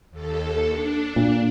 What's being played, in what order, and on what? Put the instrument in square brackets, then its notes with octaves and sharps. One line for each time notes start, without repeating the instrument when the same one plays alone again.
[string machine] D#2 A4
D4
[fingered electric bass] A#2